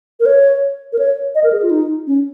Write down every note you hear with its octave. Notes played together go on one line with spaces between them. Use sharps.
A#4
C#5
A#4
C#5
D#5
A#4
G#4
F4
D#4
C#4